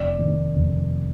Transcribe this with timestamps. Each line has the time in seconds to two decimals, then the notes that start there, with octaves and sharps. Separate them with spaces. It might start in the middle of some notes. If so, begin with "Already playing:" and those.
Already playing: F1 D5
0.19 D#3
0.55 F1